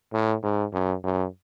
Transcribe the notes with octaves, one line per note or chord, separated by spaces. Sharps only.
A2
G#2
F#2
F#2